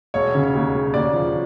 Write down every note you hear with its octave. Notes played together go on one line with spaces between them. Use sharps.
E1 C#5
C#3
D#2
E1
D#2 D5
F3